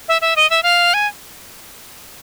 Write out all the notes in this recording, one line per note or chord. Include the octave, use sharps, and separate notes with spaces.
E5
E5
D#5
E5
F5
G#5